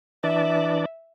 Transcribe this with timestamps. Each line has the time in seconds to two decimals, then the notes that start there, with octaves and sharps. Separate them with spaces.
0.24 E3 D4 D5 E5